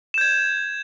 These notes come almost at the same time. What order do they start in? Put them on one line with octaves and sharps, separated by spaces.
E7 G6 G#6